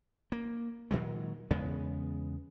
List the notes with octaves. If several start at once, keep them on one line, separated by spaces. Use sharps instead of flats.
A#3
A#2 D#3 F#3 G#3
E2 C#3 G#3 B3